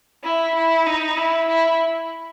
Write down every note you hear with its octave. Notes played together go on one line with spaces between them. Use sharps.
E4
E4
D#4
E4
E4